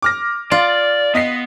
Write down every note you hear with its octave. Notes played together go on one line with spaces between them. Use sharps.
D6 F6 A#6
F4 D5
B3 D#5 B6 C7